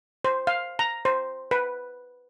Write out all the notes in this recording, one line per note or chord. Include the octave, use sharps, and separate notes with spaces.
C5
F5
A#5
C5
B4